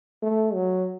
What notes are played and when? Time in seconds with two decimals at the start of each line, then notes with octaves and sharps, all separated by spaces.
0.22 A3
0.54 F#3